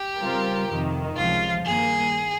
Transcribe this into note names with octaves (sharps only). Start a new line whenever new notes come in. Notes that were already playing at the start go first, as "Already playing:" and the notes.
Already playing: G4
C#3 G3 C4 F4 A#4
F2 C3 D#3
C#2 C3 F3 F4
G2 D#3 A#3 G#4